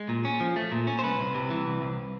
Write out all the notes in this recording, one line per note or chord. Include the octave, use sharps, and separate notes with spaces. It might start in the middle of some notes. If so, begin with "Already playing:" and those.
Already playing: G#3
A#2
C#4
F3
A3
A#2
C#4
C5
C2 B4
C2
C3
E3
C2
C2